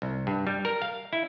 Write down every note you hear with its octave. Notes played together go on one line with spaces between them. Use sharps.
C2
G2
G3
A#4
F5
E4